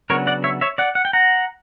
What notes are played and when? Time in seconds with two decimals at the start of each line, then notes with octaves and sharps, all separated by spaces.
0.10 C#3 F#3 B3 D4 A#4 C#5
0.27 D5 F#5
0.44 C#5 E5
0.61 C#5 E5
0.78 D5 F#5
0.95 F#5
1.05 G5
1.13 F#5 A#5